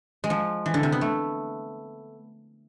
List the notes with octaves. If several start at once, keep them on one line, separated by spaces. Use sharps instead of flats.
G#3
F3
E3
D3
C3
B3
A3